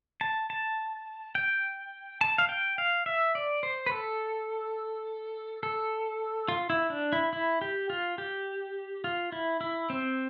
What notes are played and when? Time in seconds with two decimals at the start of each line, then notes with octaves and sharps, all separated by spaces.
0.21 A5
0.50 A5
1.35 G5
2.21 A5
2.38 F5
2.49 G5
2.78 F5
3.06 E5
3.35 D5
3.63 C5
3.86 B4
3.91 A4
5.63 A4
6.48 F4
6.70 E4
6.90 D4
7.13 E4
7.33 E4
7.61 G4
7.90 F4
8.18 G4
9.04 F4
9.32 E4
9.61 E4
9.90 C4